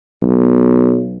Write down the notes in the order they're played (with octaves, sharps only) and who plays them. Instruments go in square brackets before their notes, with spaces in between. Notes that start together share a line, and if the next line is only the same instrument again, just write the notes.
[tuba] B1